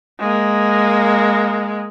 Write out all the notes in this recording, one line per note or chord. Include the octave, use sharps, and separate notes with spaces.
G#3 A#3